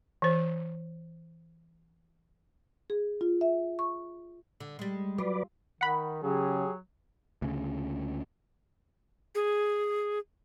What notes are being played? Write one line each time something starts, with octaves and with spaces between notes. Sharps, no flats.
E3 C5
G#4
F4
E5
C#6
D3
G3 G#3
F#3 F4 B4 D5
D#3 F#5 B5
C#3 F#3 G4 G#4
D2 C#3
G#4